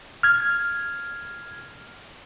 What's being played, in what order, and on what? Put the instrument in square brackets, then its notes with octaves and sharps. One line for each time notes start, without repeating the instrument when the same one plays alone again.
[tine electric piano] F6 G#6